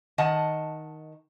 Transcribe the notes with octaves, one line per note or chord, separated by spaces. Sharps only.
D#3 D#5 F#5 A5